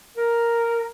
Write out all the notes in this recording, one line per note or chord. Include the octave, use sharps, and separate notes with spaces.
A#4